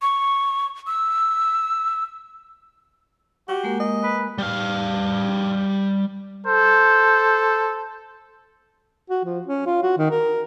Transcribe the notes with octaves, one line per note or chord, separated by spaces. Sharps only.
C#6
E6
F#4 G4
G#3 A#3 A#4
D#5
B4
G3 F5
A4 C5
F#4
F3
C#4
F4
F#4
D#3
A#4